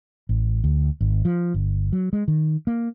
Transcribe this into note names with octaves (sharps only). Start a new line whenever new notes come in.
A1
D2
G#1
F3
G1
F#3
G#3
D#3
A#3